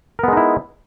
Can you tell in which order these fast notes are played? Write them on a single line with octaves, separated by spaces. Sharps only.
A#4 B3 G#3 D#4 E4